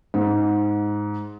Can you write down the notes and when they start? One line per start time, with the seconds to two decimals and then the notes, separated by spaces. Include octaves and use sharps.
0.14 G#2